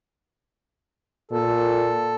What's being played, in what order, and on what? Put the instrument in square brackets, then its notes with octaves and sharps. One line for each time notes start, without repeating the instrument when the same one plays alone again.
[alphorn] A#2 [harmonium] A4